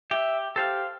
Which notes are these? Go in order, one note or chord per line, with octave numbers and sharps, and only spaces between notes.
G4 E5
G4 A4 C5 F5